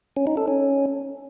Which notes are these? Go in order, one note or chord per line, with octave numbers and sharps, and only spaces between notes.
C#4
D#4
A4
C#4